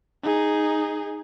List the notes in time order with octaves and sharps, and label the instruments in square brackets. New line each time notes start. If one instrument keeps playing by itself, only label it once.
[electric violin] D#4 G#4